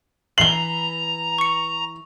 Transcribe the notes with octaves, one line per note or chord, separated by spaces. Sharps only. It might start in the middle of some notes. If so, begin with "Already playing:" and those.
E3 B4 A#5 C7 F#7 G7
C#6 C#7